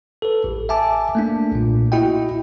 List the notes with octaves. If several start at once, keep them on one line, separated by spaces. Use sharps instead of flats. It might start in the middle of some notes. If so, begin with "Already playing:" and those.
A4 B4
A1
E5 G#5 A5 D6
A3 A#3 D4
B1 A#2
E4 F#4 D#5 G5